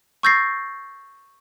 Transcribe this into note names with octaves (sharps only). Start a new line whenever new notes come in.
C#6 E6 G6 A6 A#6 C7